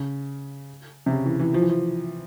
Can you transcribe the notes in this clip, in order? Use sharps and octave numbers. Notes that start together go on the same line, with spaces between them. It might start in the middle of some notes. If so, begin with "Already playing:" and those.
Already playing: C#3
C3
C#3
E3
E3
F3
E3
F3